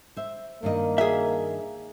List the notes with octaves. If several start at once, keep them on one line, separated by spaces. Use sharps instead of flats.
C5 E5
G2 D#3 A#3 D#5
G#4 E5